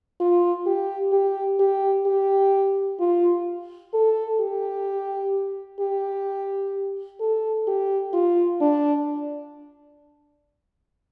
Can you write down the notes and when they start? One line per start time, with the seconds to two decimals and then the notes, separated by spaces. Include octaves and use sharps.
0.20 F4
0.66 G4
1.13 G4
1.59 G4
2.06 G4
3.00 F4
3.94 A4
4.40 G4
5.80 G4
7.20 A4
7.67 G4
8.14 F4
8.61 D4